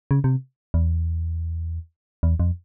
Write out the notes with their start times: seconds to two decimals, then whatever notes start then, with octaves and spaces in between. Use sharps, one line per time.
0.11 C#3
0.24 C3
0.74 E2
2.23 E2
2.40 F2